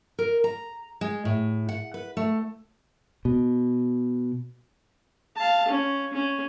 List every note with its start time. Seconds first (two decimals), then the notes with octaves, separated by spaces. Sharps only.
0.19 A#4
0.44 A#5
1.01 G#3
1.25 A2
1.69 F#5
1.94 B4
2.17 A3
3.25 B2
5.36 F5 A5
5.68 C#4
6.13 C#4